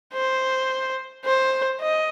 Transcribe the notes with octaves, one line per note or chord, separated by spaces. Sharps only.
C5
C5
D#5